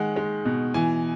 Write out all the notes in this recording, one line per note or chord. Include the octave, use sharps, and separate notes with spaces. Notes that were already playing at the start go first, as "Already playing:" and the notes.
Already playing: D#3 G#3 F#5
G#3
B2
E3 G#5